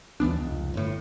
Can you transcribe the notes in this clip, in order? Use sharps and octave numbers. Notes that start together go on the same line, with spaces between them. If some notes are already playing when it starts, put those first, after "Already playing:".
D#2 E3 B3 D4
F1 C#2
G1 A2